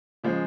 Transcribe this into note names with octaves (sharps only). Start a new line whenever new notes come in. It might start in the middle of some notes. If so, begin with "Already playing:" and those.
C#3 F3 G#3